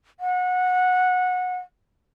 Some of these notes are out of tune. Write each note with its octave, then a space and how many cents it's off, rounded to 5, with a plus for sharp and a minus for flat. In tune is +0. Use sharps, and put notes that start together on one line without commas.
F#5 -20